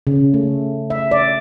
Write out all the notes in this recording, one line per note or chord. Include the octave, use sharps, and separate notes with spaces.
C#3
A3
E5
D5